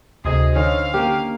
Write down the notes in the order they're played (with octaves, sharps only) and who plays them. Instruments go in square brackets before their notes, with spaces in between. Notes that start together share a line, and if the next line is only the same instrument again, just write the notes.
[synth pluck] D2 C3 [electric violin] G#4 [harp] C5 D#5 G#6
[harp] D3 [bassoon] C#4 [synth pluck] D#4 [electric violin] F5
[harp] A#3 C#4 [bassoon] G4